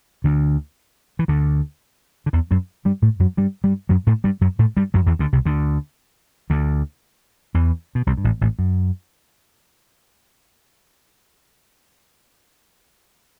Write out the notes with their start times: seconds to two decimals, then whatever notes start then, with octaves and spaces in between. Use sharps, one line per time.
0.24 D2 D3
1.19 E3
1.28 D2 D3
2.26 D3
2.33 E2 E3
2.51 F#2 F#3
2.85 G2 G3
3.02 A2 A3
3.19 F#2 F#3
3.37 G2 G3
3.64 G2 G3
3.89 F#2 F#3
4.07 A2 A3
4.24 G2 G3
4.41 F#2 F#3
4.59 A2 A3
4.77 G2 G3
4.94 F#2 F#3
5.07 E2 E3
5.19 D2 D3
5.33 C2 C3
5.45 D2 D3
6.50 D2 D3
7.54 E2 E3
7.95 B2
8.07 C2 C3
8.17 G2
8.24 A1 A2
8.41 A1 A2
8.59 F#2